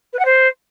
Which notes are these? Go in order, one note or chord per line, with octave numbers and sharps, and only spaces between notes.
B4
F#5
C5